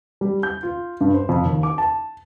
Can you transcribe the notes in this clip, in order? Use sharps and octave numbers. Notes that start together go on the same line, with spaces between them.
G3
G6
F4
G2
C5
F2
D#2
D6
A5